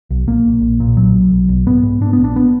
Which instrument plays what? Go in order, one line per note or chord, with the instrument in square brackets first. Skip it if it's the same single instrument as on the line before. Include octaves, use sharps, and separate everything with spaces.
[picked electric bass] B1
A#1 A#3
A#1
A#1
A#2
B1 F#3
B1
B1
B1
G#2 B3
G#2
G#2 D4
A#1 B3
D4
B3